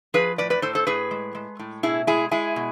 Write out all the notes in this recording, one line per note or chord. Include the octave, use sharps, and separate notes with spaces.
F3 G#4 B4
A2 B4 D5
B4 D5
A2 A4 C5
A4 C5
A2 G#4 B4
G#3
G#3
A2
B2 E4 G#4
G#3 E4 G#4
G#3 E4 G#4
B2